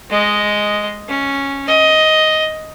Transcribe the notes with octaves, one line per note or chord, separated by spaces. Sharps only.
G#3 D#5
C#4
D#5